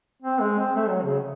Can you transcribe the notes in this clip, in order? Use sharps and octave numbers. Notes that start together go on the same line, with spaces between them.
C4
G#3
C4
A3
F#3
C#3